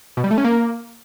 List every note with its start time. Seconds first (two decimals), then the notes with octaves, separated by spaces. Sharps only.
0.17 B2
0.24 G3
0.31 A3
0.38 C#4
0.45 A#3